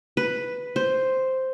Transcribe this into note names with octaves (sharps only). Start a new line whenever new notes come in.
B4
C5